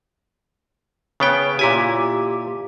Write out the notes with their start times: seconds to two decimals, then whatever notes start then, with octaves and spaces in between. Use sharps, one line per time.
1.20 C#3 B3 C#5 G5
1.59 A#2 E4 G4 G#5